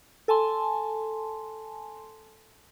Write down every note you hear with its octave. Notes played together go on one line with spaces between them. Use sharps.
A4 G#5 A5 C6